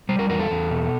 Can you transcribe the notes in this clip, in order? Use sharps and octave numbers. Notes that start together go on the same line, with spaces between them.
G3 C5
A#4
E2 A#4
A4
E2
B2